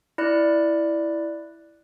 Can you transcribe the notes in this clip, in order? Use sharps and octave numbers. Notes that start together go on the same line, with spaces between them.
E4 D5 F#6